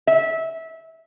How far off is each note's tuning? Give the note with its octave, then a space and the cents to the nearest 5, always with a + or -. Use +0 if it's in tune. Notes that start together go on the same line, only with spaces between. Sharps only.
E5 -20